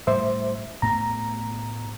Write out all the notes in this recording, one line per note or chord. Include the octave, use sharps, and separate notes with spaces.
A2 G3 C5 E5
A2 A3 B3 A#5